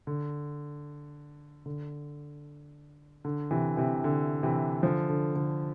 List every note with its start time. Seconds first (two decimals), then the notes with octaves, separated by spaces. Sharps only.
0.07 D3
1.66 D3
3.25 D3
3.51 C3 E3
3.77 C3 E3
4.04 D3
4.43 C3 E3
4.83 D3 F3
5.09 D3
5.36 D3